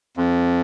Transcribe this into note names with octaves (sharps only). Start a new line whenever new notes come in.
F2